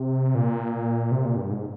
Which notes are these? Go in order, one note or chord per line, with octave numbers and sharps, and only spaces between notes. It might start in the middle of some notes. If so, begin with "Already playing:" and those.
Already playing: C3
A#2
C3
A#2
G2
G#2